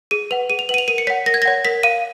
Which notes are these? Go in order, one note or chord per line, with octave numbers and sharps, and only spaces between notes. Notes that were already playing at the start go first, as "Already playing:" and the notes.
G#4 D#7
B4 F#5 F7
G#4 D#7
F7
B4 F#5 D#7 F#7
F7
A#4 D#7
C#7
C#5 F#5 B6
A#4 A#6
G#6
A#6
C#5 F#5
A#4 B6
F5 D#7